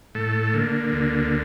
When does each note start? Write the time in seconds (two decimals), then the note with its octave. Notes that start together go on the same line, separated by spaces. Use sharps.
0.15 A2 A4
0.53 D3 A#3
0.92 D2